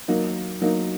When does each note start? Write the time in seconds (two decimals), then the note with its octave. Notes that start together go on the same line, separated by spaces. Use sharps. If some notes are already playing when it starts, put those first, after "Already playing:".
0.08 F#3 A#3 D#4
0.62 F#3 A#3 D#4